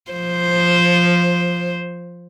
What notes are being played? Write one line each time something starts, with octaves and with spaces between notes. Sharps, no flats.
F3 C5